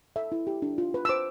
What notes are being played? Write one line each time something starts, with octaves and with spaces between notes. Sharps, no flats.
A4 E5
E4
G4
D4
F4
B4
E6
C5 D6